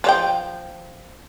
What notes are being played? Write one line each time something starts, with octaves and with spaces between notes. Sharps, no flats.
F3 C#5 G5